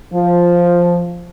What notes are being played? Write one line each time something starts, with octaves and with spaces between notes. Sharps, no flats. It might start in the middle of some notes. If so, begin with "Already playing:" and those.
F3